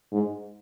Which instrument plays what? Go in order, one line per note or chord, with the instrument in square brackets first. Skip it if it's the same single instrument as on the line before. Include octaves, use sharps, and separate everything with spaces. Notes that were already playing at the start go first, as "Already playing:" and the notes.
[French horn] G#2